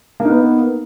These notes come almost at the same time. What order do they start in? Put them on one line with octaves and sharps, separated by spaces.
A#3 D#4 B3